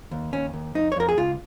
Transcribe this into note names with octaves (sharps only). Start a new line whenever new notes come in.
D#2
D#2 C#4
D#2
F2 D#4
C#5
F2 A#4
G#4
C#2 F4